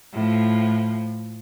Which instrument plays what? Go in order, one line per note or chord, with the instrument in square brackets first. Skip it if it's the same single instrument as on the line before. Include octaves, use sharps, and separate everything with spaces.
[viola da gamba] A2 F3